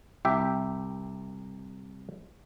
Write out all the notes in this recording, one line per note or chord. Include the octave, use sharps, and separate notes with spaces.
C2 G4 E5 G5